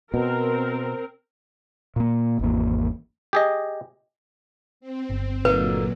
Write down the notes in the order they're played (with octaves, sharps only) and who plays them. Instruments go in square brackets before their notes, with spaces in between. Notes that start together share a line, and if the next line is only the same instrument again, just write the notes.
[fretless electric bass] B2 [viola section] C4 A#4
[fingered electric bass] A#2 A#3
G#1 E2 A#3
[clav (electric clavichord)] G4 G#4 D#5
[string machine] C4
[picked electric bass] G1
[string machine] A#2 F#3 [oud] D3 A#3 D#4 [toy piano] B4